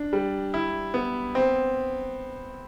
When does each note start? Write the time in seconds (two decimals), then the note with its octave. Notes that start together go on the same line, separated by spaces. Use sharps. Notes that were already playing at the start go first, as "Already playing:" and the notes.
Already playing: D4
0.13 G3
0.54 E4
0.94 B3
1.35 C4